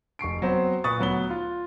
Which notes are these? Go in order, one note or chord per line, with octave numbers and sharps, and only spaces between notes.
F1 C#6 C7 D7
F#3 B3 C4 C5
A#2 B4 C#6 D#6 A6
D2 F#3 B3 G7
F4